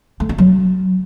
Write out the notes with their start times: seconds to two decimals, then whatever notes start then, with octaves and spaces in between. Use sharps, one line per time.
0.20 A3
0.29 F4
0.38 F#3